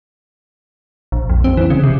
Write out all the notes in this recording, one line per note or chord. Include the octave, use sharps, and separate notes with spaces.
A#1
F2
C4
E3
C#3
C3